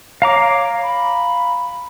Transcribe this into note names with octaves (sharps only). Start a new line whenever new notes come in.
C#5 F5 A#5 D6
B5